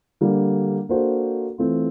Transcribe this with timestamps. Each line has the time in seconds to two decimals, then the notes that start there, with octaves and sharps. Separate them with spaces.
0.21 D3 G3 A#3
0.89 A#3 D4 F#4 A4 C5
1.58 E3 A3 C4 F4